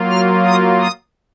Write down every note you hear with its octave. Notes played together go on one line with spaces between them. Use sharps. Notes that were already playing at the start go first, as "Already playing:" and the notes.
Already playing: F#3 A#3 F4
F6
D#6
D#6